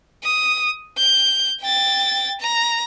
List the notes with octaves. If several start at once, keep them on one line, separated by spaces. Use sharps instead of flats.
D#6
G6
G5 A6
A#5